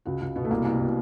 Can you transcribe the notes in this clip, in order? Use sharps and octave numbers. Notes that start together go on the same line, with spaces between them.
C#2 F#4
C#2
B2 B3
A3
C2 A#3
C2
B2